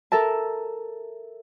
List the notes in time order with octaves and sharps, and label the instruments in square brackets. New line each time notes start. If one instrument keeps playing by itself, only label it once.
[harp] A4 A#4 E5 A5